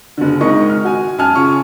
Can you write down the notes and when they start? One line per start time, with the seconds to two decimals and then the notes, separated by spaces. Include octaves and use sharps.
0.17 F#1 D3
0.41 G#1 G#2 D#3 D#5 C#6
0.70 F6
0.84 F#4 G#5
1.18 F#2 G#5 A5 F6
1.35 C#3 F4 C#6